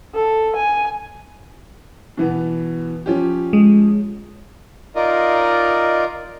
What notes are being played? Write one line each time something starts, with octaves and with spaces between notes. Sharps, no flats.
A4
G#5
B2 E3 B3
F3 C#4 G4
G#3
D#4 F4 A#4 D5 D#5